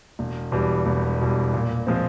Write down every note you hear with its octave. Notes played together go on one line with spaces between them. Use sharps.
E1
E2 B2 G3
E1
E2 B2 G3
A#2
F3 G#3 C4